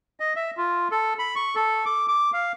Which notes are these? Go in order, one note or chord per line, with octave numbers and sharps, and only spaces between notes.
D#5
E5
F4
A4
B5
C#6
A4
D6
D6
F5